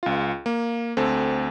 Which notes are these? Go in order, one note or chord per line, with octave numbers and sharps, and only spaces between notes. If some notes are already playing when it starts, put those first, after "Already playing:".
C#2 F4
A#3
D2 C4 A4